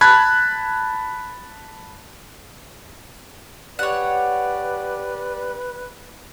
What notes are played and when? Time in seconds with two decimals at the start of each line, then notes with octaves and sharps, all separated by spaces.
0.01 A5 B5 F#6 G#6
3.79 G4 B4 C#5 D5 F#5